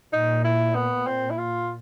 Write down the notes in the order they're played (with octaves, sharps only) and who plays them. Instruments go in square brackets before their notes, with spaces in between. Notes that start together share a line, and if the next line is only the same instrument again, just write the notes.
[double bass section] A#2 [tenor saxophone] D#4
[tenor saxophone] E4
B3
C4
E4
F4